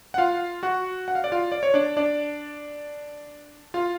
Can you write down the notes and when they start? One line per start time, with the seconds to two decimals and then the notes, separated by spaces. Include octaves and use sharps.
0.14 F#5
0.18 F4 F5
0.63 F#4 F#5
1.08 F#5
1.15 F5
1.24 D5
1.32 F4 F5
1.52 D5
1.63 C#5
1.74 D4 D5
1.97 D4 D5
3.74 F4 F5